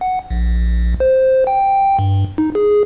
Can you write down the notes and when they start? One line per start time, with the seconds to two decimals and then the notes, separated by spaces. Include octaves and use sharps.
0.01 F#5
0.30 A#1
1.00 C5
1.47 G5
1.99 G2
2.38 D#4
2.55 G#4